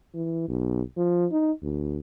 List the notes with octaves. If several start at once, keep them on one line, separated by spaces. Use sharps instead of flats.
E3
B1
F3
D#4
D2